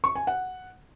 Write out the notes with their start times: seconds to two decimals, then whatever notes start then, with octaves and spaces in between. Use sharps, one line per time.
0.04 C#6
0.16 G#5
0.27 F#5